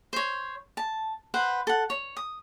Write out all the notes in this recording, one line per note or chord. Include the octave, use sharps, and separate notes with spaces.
C5 C#5
A5
B4 C5 F#5
A4 F#5
C#5
D#6